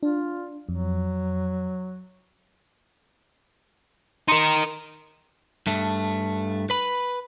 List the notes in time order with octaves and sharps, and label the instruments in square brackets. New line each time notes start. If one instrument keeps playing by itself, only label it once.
[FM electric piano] D4 [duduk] F4
[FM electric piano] F2 [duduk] F#3
[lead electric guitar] D#4 A#4 [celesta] C6 C#7
[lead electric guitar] G2 A3
B4 B5